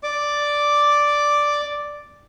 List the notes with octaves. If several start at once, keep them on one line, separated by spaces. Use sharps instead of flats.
D5 D6